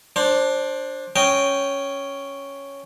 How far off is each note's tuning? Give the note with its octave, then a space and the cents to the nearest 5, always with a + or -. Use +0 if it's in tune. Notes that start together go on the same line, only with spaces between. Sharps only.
D4 +0 C5 +20
C#4 +0 D#5 -15 G5 -5